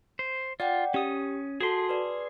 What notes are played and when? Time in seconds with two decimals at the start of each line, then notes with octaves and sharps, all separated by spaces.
0.19 C5
0.60 F4 D5 F#5 G5
0.94 C#4 G4 D#6
1.61 F#4 G#4 A4 A5 C6
1.89 B4 D5